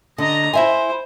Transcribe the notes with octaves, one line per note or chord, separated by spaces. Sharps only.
D3 D#5 A#5
E4 C5 E5 G#5